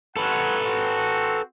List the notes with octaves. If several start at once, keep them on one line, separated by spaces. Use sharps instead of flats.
C4 C#4 A4 B4 F#5
C4 F#4